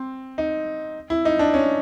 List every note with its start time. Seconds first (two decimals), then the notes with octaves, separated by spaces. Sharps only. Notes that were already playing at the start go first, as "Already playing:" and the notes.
Already playing: C4
0.38 D#4
1.10 E4
1.25 D#4
1.39 D4
1.54 C#4